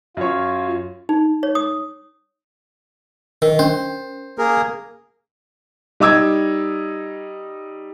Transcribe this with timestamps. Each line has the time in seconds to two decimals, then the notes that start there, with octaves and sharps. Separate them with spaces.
0.17 F#2 F4 C#5
1.09 D#4
1.43 C#5
1.55 D#6
3.42 D#3 A#4
3.59 C#4 C5
4.38 A#3 G#4 A#4
6.00 G3 D#4 D6 E6 G#6